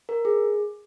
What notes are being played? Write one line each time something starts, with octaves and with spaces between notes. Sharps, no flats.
A#4
G#4